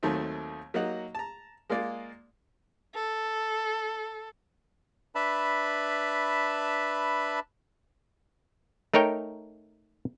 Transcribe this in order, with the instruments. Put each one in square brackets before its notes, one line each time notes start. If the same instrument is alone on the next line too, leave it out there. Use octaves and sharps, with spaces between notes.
[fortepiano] D#2 D#3 F#3 A3 C4
F#3 A#3 D#4 D#5 F#5
A5 A#5
G#3 A#3 F4 D5
[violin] A4
[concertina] D4 B4 E5 A5 B5
[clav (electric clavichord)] A3 D#4 A#4 C#5 G5